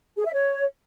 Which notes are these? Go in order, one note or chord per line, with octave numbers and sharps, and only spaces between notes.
G#4
E5
C#5